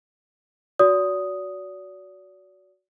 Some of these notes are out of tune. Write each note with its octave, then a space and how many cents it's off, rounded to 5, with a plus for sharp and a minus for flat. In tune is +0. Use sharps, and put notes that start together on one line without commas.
F#4 +0 D5 -35 D#6 +0